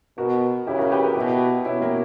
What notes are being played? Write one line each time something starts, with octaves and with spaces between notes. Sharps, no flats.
B2 F#4 A#4
C#3 E4 G4
F#4 A#4
G4 B4
F#4 A#4
B2 E4 G4
B2 C#4 E4
A#3